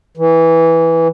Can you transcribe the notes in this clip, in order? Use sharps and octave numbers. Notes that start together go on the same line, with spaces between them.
E3